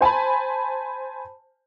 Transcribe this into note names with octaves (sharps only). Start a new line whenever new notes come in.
C5 G#5 A5 B5